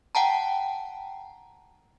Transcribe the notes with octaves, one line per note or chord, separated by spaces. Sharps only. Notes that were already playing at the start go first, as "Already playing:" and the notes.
F#5 G5 A5 A#5